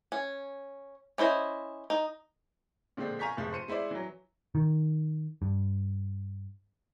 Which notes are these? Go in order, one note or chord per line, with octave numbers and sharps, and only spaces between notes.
C#4
C#4 E4 C5 D#5
D#4
A#2 D3 F3 G#3 C4
F5 G#5 A#5 C#6 G6 B6
F1 F3 G#3
C5 C#7 D#7
G#3 E4 C5 D5
E3 F#3
D#3
G2